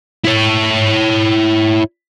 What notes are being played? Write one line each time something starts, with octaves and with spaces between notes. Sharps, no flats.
E4 C#5